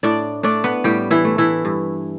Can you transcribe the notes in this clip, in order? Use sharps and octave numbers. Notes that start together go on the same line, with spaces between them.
A2 D4 D5
A3 D4 D5
B3 B4
A2 G3 G4
E3 E4
A3
E3 E4
G2